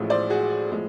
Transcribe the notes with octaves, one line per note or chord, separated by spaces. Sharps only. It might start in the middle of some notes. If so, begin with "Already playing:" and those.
Already playing: A1 A2 F3 G#3
C5 D5
F#4 G#4
A2 F3 G#3